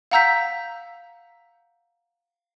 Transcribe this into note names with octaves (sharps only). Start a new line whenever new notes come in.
F5 F#5 A#5 E6 G6 B6